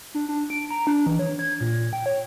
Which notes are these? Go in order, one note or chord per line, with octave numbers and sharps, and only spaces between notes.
D4
D4
D7
A#5
D4
E3
C#5
G#6
A#2
G5
C#5